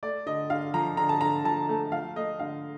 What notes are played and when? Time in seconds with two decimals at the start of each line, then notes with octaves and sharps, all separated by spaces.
0.03 A3 D5
0.26 D3 D#5
0.50 D3 F5
0.74 F3 A#5
0.97 D3 A#5
1.09 A5
1.21 D3 A#5
1.45 F3 A5
1.69 A3
1.92 F3 F5
2.16 A3 D#5
2.39 D3 F5